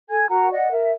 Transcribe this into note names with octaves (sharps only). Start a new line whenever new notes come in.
A4 G#5 G#6
F#4 A#4 F#5 A#5
D5 D#5 F#5
A#4 E5